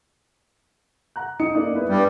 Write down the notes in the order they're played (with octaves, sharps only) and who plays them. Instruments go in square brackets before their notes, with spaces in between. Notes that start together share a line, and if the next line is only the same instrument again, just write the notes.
[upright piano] F#5 A#5 F#6
D#4 D#6 C#7
A#3 D#4 D5
B3 E4 B4
[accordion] G2 G3